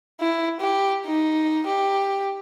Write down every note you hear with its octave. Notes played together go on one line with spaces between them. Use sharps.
E4
G4
D#4
G4